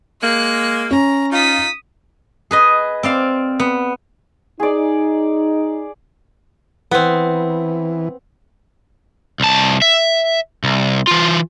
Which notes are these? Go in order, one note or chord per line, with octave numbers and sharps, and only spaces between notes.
G#3 A#3 F#6 C#7
C#4 A#5
D#4 F4 D#6 B6
G#4 B4 D#5
C4 D5 F5
B3
D#4 G#4 D5
E3 B3 C4
C2 A5
E5
C2
E3 F4